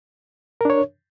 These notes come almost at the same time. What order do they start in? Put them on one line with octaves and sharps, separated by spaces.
A#4 D4 C#5